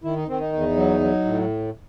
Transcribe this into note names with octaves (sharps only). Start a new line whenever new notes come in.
D#3 E4
D#4
D#3 C4
D#4
E2
F#3
F#3
A2